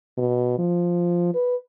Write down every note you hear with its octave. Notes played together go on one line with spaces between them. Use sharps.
B2
F3
B4